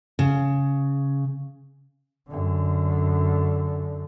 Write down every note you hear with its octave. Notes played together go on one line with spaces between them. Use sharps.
C#3
F#2 D3